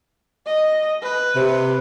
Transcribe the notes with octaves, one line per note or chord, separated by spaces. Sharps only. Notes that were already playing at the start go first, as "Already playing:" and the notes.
D#5
B4
C3